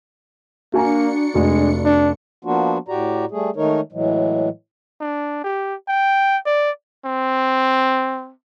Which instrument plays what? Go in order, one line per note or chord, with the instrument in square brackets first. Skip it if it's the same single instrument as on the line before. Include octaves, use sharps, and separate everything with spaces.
[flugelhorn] A#3 [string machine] D4 C#7 [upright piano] F#4 G#5 A#5
[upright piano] F1 F#4 [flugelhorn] G#3
[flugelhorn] D4
[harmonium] F3 A#3 B3 D4 F4 F#4
A2 F#4 G4 D5 A#5
G3 A3 G#4
D#3 G#3 A3 D#4 A#4 C#5
A2 E3 F#3 G#3
[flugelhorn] D4
G4
G5
D5
[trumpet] C4